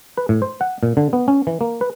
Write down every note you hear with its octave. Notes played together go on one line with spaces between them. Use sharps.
B4
A2
C5
F#5
A#2
D3
B3
C#4
E3
A#3
B4